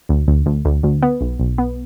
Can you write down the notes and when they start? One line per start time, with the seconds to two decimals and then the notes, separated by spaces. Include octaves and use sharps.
0.09 D2
0.28 D2
0.46 D2
0.65 D2
0.83 D2
1.02 B3
1.21 B1
1.40 B1
1.58 B3